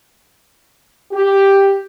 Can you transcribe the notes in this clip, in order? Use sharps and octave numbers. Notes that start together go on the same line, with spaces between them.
G4